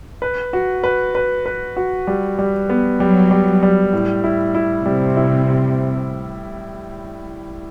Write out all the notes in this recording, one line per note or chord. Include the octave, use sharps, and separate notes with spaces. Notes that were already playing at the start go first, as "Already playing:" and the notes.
B4
F#4
B4
B4
B4
F#4
G3
G3
B3
F#3 G3
G3
G3
A2
E4
E4
C3 G3
E4